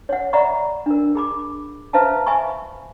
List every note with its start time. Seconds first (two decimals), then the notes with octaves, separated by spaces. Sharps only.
0.09 C#5 F#5
0.33 D5 E5 F#5 A#5 B5 C#6
0.86 D4 A#4
1.15 G#4 B5 D6
1.93 B4 C5 E5 F5 A5 A#5
2.27 E5 G#5 B5 C#6